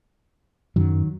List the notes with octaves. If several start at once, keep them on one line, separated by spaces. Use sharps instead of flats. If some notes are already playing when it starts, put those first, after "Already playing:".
F#2 D#3 F#3